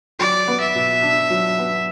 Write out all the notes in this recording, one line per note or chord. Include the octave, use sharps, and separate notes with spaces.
F#3 D5
B3
E5
B2
D4
F#3
B3